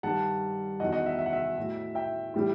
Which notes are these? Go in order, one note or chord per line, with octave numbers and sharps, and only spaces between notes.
G2 D#3 G3 F#5 A5
E2 D#3 F#3 D#5 F#5
D#5 F#5
E5
E5
F#5
E5
A2 F#3
E5 G5
A2 E3 G3